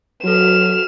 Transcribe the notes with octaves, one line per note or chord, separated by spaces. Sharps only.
F#3 F#4 A4 F6 E7